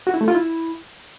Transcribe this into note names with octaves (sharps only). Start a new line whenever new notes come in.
F#4
E4
A3
F4
E4